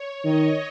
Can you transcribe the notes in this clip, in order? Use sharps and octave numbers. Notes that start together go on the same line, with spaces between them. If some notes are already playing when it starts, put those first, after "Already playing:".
Already playing: C#5
D#3 D#5